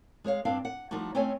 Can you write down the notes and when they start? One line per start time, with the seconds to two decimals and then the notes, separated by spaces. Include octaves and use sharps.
0.24 G#3 G#4 C#5 F5
0.45 G2 C4 D4 F5
0.65 F#5
0.91 F3 G3 A3 D#4 F#4
1.15 A3 C4 C#4 C#5 D#5 G#5